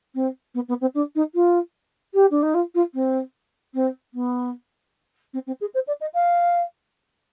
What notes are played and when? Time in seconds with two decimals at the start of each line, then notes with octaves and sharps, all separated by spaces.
0.15 C4
0.54 B3
0.68 B3
0.81 C4
0.95 D4
1.15 D#4
1.35 F4
2.14 G4
2.31 D4
2.43 D#4
2.54 F4
2.75 F4
2.94 C4
3.74 C4
4.14 B3
5.33 C4
5.47 C4
5.61 G#4
5.74 C5
5.87 D5
6.01 D#5
6.14 F5